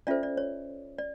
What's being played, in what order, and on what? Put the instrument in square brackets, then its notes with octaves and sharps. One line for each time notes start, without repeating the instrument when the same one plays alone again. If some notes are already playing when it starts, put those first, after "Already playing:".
[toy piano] C#4 F4 A4 C5 D5 E5
D5
C#5
D5